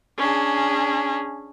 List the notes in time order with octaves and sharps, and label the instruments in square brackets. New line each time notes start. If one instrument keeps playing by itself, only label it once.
[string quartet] C#4 D4 G#4